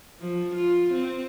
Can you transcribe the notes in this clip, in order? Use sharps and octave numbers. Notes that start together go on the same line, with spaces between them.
F3
F4
C4